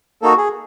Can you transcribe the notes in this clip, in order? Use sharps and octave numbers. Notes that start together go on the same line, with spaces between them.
A#3 D#4 F#4 A4
G#4